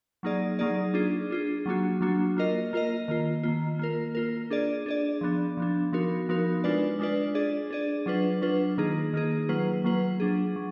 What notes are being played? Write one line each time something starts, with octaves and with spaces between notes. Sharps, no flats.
F#3 A#3 D#4 G#4 D5
F#3 A#3 D#4 G#4 D5
D4 F4 G#4
D4 F4 G#4
F#3 A#3 D4 F#4
F#3 A#3 D4 F#4
A#3 F4 A#4 D#5
A#3 F4 A#4 D#5
D#3 A#3 F4
D#3 A#3 F4
A#3 F4 A#4
A#3 F4 A#4
D4 G#4 D5
D4 G#4 D5
F3 B3 D4
F3 B3 D4
F3 B3 D#4 F#4 A#4
F3 B3 D#4 F#4 A#4
G#3 D4 F4 B4 D5
G#3 D4 F4 B4 D5
D4 G#4 D5
D4 G#4 D5
F#3 D4 F4 B4
F#3 D4 F4 B4
D#3 A#3 D#4 G#4
D#3 A#3 D#4 G#4
F#3 A#3 F4 B4
F#3 A#3 F4 B4
F#3 D4 G#4
F#3